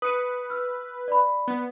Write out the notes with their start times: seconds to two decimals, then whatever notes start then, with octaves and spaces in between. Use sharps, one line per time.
0.02 B4 D#6 C#7 D#7
0.50 E6 F6
1.08 D5 B5
1.48 B3